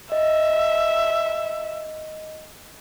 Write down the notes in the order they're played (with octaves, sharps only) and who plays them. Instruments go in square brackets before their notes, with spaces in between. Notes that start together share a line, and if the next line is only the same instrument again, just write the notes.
[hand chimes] D#5 [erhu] E5